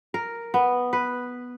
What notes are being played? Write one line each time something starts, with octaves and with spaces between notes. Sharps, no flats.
A#4
B3
B4